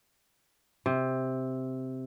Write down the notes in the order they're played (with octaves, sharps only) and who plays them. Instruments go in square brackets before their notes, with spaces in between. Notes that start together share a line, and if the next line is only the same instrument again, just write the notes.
[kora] C3